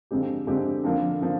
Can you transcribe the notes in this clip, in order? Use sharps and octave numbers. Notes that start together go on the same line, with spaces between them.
F2 D3 G#3 C4 G4
F2 D3 G#3 C4 G4
F2 D3 F3 A#3
D3 F3 A#3